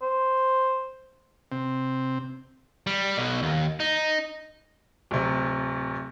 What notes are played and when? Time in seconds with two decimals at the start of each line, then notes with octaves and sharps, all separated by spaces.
0.02 C5
1.52 C3 C4
2.87 G3
3.17 B1 B2
3.43 D#2
3.80 D#4
5.11 D1 C3